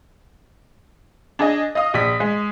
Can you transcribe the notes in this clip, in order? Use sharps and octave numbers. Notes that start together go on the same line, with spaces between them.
D4 G#4 D#5
D#5 F5 D#6
A#1 B6
G#3